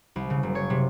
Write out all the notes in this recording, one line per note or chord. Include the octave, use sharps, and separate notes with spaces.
C2
C#3
F#1
C#5
C3